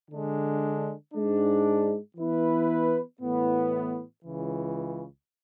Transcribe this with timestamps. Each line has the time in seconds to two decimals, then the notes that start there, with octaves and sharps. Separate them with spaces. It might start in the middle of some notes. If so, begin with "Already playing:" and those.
0.11 D3 G#3 D4
1.14 G#2 G#3 D4
2.17 E3 B3 E4 B4
3.21 A2 E3 B3
4.24 C#2 C#3 E3